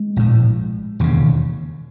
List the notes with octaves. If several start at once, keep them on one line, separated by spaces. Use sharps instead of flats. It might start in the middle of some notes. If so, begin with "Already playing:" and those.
Already playing: G#3
A#1 A2
E1 D#2 C#3